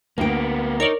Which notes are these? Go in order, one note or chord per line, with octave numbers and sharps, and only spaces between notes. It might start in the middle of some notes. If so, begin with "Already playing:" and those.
D2 A#3 B3 G5
D#4 A#4 C#5 D5